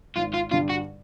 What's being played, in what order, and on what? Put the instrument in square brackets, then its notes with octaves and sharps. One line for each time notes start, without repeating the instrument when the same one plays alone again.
[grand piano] G#1 [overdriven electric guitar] F4
[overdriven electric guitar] F4
[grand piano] G2 D3 G3 [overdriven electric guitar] F4
[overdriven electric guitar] F#4